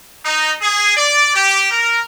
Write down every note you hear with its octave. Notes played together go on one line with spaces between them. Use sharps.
D#4
G#4
D5
G4
A#4